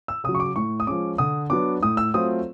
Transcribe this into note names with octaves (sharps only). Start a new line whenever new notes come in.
E6
C#3 F#3 D#6
C#6
D6
A2 C#6
D#6
F3 G#3 C#4 D6
D3 D#6
F#3 B3 D4 D6
A2 D#6
E6
F#3 A3 C4 F4 D#6